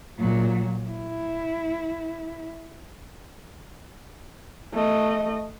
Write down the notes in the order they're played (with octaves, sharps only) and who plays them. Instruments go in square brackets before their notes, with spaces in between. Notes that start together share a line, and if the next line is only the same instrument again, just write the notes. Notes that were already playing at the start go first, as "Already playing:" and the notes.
[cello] A#2 F#3
E4
[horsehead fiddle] A3 D#5